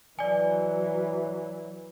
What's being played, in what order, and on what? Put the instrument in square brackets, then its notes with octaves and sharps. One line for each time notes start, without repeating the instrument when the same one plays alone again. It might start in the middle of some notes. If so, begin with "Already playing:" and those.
[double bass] E3 F#3 [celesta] D5 G#5